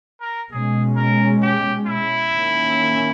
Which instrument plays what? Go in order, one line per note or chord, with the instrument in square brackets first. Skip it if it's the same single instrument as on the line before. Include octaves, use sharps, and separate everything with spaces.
[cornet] A#4
[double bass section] B2 G#3 C#4 [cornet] G#4
[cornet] A#4
G4
E4
[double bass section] D#3 A#3 C#4